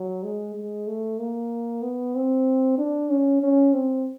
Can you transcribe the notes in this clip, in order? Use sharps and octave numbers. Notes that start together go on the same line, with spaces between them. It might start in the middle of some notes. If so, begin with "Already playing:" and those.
Already playing: F#3
G#3
G#3
A3
A#3
B3
C4
D4
C#4
C#4
C4